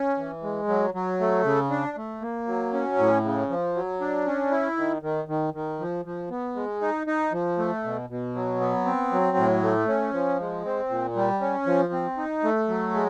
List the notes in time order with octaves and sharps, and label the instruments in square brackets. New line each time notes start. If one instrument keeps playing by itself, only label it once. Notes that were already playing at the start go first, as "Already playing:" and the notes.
Already playing: [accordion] C#4
E3
G#3
F#3
F#3
A3
C#3
D4
A3
A#3
F#3
C#4
A2
C#3
F3
F#3
D4
C#4
E4
D#3
D#3
D#3
D#3
F3
F3
B3
G#3
D#4
D#4
F3
A3
B2
B2
F#3
B3
C4
F#3
A2
A3
C#4
F3
G#3
C4
A#2
G3
C#4
F3
C4
D#4
A3
F#3
G#3